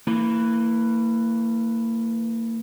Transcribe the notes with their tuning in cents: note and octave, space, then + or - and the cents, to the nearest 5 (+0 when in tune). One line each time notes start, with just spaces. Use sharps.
E3 +0 A#3 -35